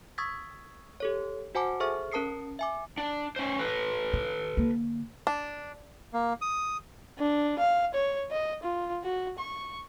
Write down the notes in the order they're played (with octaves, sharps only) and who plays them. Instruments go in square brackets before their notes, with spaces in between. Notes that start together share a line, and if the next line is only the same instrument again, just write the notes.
[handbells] C#6 D#6 E6 G#6 A6 B6
G4 A4 C#5
F#4 C5 F#5 G#5 A5 D6
G#4 A4 C5 E5 C#6 F6
C#4 A#4 A5 D#6 C7 C#7
E5 G#5 D6
[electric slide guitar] D4
C#4 C5
A4 B4
[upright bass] D#3
D3 A#3
[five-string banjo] D4
[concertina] A#3
D#6
[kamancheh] D4
F5
C#5
D#5
F4
F#4
C#6